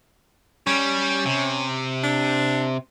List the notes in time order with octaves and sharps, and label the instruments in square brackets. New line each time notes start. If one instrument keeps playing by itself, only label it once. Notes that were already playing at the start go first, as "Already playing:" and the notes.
[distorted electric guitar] G3 [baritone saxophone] C#4
[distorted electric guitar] C3
[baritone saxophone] D4